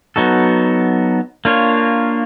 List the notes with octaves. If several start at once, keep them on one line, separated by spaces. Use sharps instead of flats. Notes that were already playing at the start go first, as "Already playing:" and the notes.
F#3 B3 D#4 F#4 A4
A#3 D4 F4 A#4 C#5